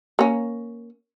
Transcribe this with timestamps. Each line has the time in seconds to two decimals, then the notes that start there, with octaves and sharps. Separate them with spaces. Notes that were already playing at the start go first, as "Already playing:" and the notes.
0.19 A#3 C#4